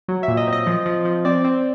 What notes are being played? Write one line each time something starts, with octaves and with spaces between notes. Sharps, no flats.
F#3
A#2 E5
D#5
C4 D#5
F3
F3
F3
C4 D5
C4